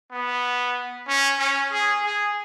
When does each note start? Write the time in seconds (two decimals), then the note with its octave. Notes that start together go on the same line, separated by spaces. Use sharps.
0.11 B3
1.08 C#4
1.39 C#4
1.72 G#4
2.04 G#4